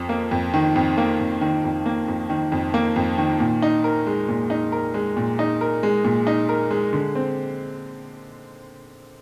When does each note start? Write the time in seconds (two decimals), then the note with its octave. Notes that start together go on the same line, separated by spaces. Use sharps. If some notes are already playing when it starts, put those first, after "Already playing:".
Already playing: F2
0.09 A#3
0.31 F2
0.54 D#3
0.76 F2
0.98 A#3
1.20 F2
1.41 D#3
1.64 F2
1.86 A#3
2.08 F2
2.30 D#3
2.52 F2
2.74 A#3
2.96 F2
3.18 D#3
3.40 A#2
3.62 D#4
3.84 A#4
4.07 G#3
4.28 A#2
4.50 D#4
4.72 A#4
4.94 G#3
5.17 A#2
5.39 D#4
5.61 A#4
5.83 G#3
6.04 A#2
6.27 D#4
6.49 A#4
6.71 G#3
6.93 D3
7.15 C4